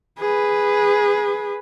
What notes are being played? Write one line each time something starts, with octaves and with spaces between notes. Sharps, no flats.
G#4 B4